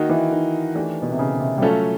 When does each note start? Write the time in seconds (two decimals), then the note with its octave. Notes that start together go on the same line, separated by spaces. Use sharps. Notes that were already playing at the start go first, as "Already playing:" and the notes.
Already playing: D#3 A#3 D#4 F#4
0.09 E3
0.31 D#3
0.75 E3 A3 D4 G4
1.02 B2
1.11 C3
1.19 C#3
1.40 C3
1.58 G3
1.61 F#3 A3 C#4 F4 A4